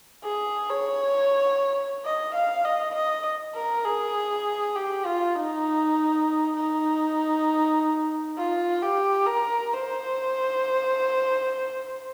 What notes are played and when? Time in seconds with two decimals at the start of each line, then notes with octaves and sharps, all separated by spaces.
0.25 G#4
0.70 C#5
2.05 D#5
2.35 F5
2.65 D#5
2.95 D#5
3.56 A#4
3.85 G#4
4.76 G4
5.05 F4
5.36 D#4
6.57 D#4
8.37 F4
8.82 G4
9.27 A#4
9.73 C5